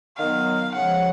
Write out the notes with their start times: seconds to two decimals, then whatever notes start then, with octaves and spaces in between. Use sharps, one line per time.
0.17 D#3 F#3 B3 F5
0.74 C#3 F3 G#3 F#5